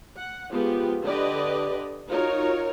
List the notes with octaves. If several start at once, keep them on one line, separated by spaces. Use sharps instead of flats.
F#5
F3 G#3 B3 F4 G4
D3 G4 B4 D5 D#5
D#4 F4 F#4 A#4 C#5